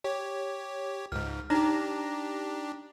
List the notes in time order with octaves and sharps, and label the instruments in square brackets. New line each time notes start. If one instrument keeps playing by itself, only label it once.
[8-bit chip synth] G4 C#5
[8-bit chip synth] C#2 G#2 [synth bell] F6
[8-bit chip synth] D4 G4 [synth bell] D#4 A#5 A#6